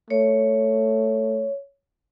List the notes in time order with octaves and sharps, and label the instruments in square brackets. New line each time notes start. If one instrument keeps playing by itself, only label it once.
[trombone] A3 [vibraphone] C#5